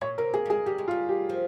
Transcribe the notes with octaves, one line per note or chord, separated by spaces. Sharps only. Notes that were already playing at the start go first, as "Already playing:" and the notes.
A#2 C#5
C3 A#4
A#3 G#4
G3
G#3 G#4
G3 G4
G#3
F4
G3
G4
F3